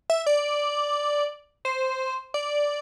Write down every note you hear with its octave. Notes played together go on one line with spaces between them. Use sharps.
E5
D5
C5
D5